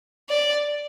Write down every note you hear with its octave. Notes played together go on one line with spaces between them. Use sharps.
D5